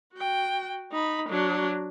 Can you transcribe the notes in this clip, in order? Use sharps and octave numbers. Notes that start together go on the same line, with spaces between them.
F#4 G5
D#4 B5
F#3 D4